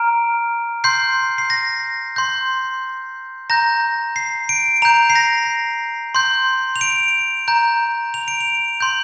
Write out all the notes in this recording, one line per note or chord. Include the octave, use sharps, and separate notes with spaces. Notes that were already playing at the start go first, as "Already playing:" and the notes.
Already playing: A#5 F6 D7
C6 G6 C7
C7
A#6
C6 G6
A#5 G6 A#6
C7
D7
A#5 G6 F7
C7
A#6
C6 G6
F7
D7
A#5 G6
F7
D7
F7
C6 G6